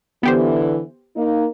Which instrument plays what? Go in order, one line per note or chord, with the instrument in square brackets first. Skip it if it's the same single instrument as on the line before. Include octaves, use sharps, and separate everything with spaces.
[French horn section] D3 E3 [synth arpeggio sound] B3 G4 C5
[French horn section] A#3 D#4